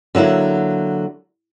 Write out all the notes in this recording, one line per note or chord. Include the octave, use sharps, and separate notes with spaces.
D3 F#3 A#3 E4